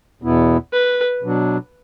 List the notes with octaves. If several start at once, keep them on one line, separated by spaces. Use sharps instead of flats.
E2 B2 B3 E4
B4
B2 F#3 D4